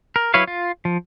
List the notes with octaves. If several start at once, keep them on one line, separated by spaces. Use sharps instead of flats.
A#4
F#3 E4 B4 C#5 F5
F4
F3